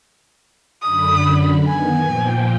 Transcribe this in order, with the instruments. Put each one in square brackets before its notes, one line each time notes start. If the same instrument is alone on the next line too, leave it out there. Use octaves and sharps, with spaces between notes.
[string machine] F#2 D3 B5 [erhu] D#6
[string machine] D#3 B3 [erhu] G#5
[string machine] A#2 F3 G5